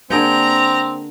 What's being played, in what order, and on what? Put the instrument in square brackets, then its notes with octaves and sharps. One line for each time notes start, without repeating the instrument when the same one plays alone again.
[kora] D3 G#4 G5 [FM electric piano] A#3 [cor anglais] C4 [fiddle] A#5